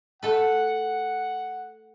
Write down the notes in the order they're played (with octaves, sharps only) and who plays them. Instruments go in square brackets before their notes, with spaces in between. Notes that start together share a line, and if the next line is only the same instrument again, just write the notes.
[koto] A3 A4 B4 [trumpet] F#5